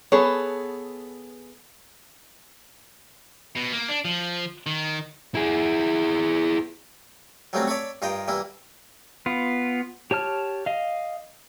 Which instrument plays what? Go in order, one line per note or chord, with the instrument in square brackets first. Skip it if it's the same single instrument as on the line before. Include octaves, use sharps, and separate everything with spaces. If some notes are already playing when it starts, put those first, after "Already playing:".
[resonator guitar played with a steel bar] B3 G#4 A4 [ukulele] C#5
[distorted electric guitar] B2
A#3
D4
F3
D#3
E4 G#4
[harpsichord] F#3 G3 A3 A#3 C4 C#4
C#5 D5 E5 A5 B5 C#6
G2 F4 A#4 D#5 G5
E3 G3 A#3 E4
[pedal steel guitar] B3 F4
G4 C#5 A5 F6
D#5 F5